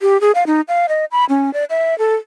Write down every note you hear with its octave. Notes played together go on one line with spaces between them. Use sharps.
G4
G#4
F5
D#4
F5
D#5
B5
C#4
D5
E5
A4